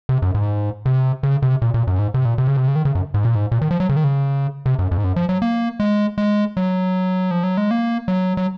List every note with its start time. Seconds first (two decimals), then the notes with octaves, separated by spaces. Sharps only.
0.09 C3
0.22 F#2
0.35 G#2
0.86 C3
1.23 C#3
1.42 C3
1.62 A#2
1.74 A#2
1.87 F#2
1.99 G#2
2.14 C3
2.25 A#2
2.38 C3
2.47 C#3
2.57 C3
2.68 C#3
2.76 D#3
2.85 C#3
2.95 F#2
3.14 G#2
3.25 A#2
3.35 G#2
3.52 A#2
3.62 D#3
3.71 F3
3.80 F#3
3.89 C#3
3.96 D#3
4.04 C#3
4.66 C3
4.79 F#2
4.91 F2
4.98 G#2
5.04 F#2
5.16 F3
5.29 F#3
5.42 A#3
5.80 G#3
6.18 G#3
6.57 F#3
7.31 F3
7.43 F#3
7.57 G#3
7.71 A#3
8.08 F#3
8.37 F#3